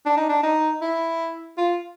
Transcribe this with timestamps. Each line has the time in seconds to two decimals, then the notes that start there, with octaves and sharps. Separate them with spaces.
0.06 D4
0.17 D#4
0.29 D4
0.43 D#4
0.82 E4
1.58 F4